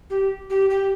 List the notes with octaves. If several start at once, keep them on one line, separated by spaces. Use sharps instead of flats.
G4
G4
G4